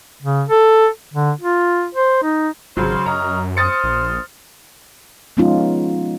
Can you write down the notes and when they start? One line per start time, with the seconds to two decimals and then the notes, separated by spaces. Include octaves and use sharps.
0.22 C#3
0.49 A4
1.13 D3
1.41 F4
1.94 C5
2.23 D#4
2.77 G#1 C#3 F#3 C5
3.06 F#2 C#5 D#5 A#5 F6
3.57 C5 D#6 F6 A6 C#7
3.84 A#1
5.37 F3 G#3 B3 C#4 D#4 F4